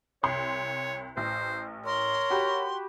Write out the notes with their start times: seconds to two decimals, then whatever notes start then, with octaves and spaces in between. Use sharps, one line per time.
0.23 C2 C#5 C6
1.17 A1 C5
1.86 A#4 C#5 C6
2.30 F#4 G4 B5